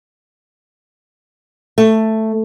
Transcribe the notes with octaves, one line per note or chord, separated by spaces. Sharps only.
A3